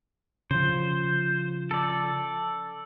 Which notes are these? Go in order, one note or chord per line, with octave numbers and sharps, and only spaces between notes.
C#3 F3 C5
A4 D5